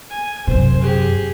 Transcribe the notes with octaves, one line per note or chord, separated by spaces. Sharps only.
G#5
F#2 C3 C5
G4 G#4